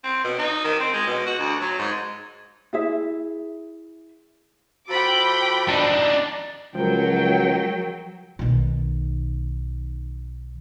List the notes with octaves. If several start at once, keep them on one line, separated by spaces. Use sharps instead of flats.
C4
B2
D#4
D#3
C4
G#3
B2
F#4
D2
F#3
G#2
E4 G#4 E5
F3 F#4 A4 G5 B5 D6
D4 D#4
C#2 F3 F#3 A#4 G5
B1 D#3